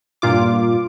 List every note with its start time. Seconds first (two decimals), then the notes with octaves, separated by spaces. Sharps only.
0.22 G2 A#2 F4 D6